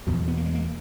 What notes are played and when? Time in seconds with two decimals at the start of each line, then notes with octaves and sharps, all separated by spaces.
0.07 E2 B2 F#3
0.28 B3
0.37 A#3
0.46 G#3
0.55 A#3